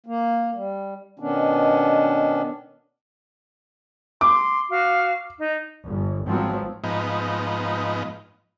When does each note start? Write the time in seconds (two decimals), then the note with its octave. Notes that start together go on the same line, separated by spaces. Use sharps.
0.06 A#3
0.54 G3
1.19 B2 D#3 B3 C#4 D4
4.21 C6 D6
4.70 F#4 F5
5.38 D#4
5.84 G1
6.28 G#1 F3 F#3 B3 C4
6.84 G#2 F3 B3 D#4